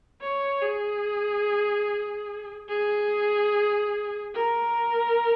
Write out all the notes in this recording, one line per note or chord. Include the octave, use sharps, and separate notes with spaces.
C#5
G#4
G#4
A#4